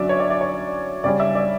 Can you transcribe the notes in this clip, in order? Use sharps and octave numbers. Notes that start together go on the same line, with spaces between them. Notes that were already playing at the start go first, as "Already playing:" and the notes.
Already playing: D3 F#3 C#4 D5 E5
C#5
D5
D5
C#5
C#3 G3 C#4 D5
E5
D5